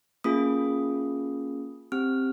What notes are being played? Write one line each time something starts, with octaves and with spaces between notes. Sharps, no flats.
A#3 C#4 F4 G#4 D#6
C4 G4 F6